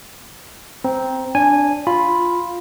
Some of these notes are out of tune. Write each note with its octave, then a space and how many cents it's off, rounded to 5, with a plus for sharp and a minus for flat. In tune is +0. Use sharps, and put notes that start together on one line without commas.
C4 -5 A#5 +10
D4 -5 C#5 +40 G#5 -10
F4 +0 B5 +0